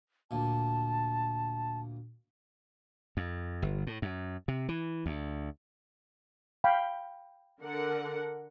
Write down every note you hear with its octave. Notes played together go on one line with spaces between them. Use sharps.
D2 A#2 A5
F2
G1
A2
F#2
C3
E3
D2
F5 G5 B5
D3 A#4 F#5